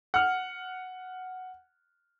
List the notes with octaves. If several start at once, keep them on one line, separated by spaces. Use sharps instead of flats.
F#5 F6